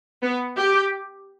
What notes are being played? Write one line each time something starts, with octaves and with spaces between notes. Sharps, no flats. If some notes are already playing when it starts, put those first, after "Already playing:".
B3
G4